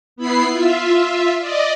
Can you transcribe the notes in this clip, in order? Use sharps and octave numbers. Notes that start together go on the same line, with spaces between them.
B3 E4 B5 C7
F4 E5
D5 D#5